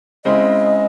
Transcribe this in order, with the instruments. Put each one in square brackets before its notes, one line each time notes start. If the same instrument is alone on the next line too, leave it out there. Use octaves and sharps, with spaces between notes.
[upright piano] C#3 G#3 C4 E4 [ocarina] D#5